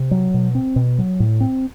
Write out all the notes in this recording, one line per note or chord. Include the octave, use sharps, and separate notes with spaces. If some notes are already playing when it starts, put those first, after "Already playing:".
Already playing: C3
F#3
B2
C4
B2
F#3
A2
C4